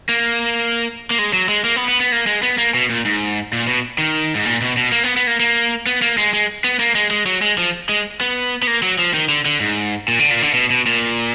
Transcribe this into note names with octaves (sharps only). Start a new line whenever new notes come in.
A#3
A#3
G#3
F#3
G#3
A#3
B3
B3
B3
A#3
G#3
B3
A#3
B2
A#2
G#2
A#2
B2
D#3
G#2
A#2
B2
B2
A#3
B3
B3
A#3
A#3
B3
A#3
G#3
G#3
B3
A#3
G#3
G#3
F#3
G#3
F3
G#3
B3
B3
A#3
F#3
F3
D#3
D3
D3
G#2
A#2
D3
A#2
D3
B2
B2
A#2